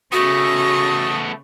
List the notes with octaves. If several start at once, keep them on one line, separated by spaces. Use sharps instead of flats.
C#3 A3 B3 F#4 C#6 D#6 A#6